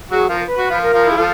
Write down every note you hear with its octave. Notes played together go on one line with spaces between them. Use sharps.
F#3 F#4 G#4
F3 F4 A#4
B4
F#4
F3 F4
A#4
F3 F4
E4 G#4
F3 F4 A4